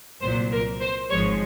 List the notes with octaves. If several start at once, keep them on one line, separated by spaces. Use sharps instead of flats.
C2 A#2 F#3 C5
A#4
C5
G#1 G#2 F3 G#3 C#5